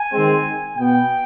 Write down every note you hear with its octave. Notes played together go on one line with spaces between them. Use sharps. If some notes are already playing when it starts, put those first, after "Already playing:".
Already playing: G#5
D#3 G#3 C4
B2 B3 G5